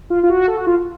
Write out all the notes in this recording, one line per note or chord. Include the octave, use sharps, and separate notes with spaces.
F4
F4
F#4
A4
F#4
F4